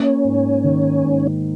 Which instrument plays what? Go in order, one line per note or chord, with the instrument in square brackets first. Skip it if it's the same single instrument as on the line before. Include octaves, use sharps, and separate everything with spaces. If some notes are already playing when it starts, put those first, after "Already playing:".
Already playing: [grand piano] A#3 [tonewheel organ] C#4
[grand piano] G#2
D#3
G#2